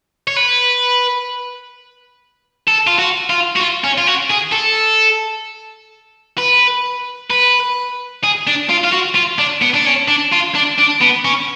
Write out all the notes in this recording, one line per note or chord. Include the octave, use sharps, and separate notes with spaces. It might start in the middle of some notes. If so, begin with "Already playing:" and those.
C#5
B4
A4
F4
F#4
F4
F#4
F4
C#4
F4
F#4
G#4
A4
B4
B4
G#4
D4
F4
F4
F#4
F4
D4
B3
D4
C#4
D4
F4
D4
D4
B3
C#4